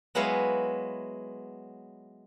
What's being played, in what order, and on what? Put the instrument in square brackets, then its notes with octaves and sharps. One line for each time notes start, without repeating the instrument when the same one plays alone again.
[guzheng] F#3 G#3 B3 E4 C#5 F5